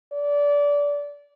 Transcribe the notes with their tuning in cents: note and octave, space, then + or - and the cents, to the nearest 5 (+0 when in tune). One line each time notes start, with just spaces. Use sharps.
D5 -25